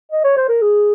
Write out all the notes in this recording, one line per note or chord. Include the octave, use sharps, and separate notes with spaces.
D#5
C#5
C5
A#4
G#4